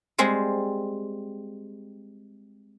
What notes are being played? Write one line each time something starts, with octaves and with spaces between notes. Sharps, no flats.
G3 G#3 C4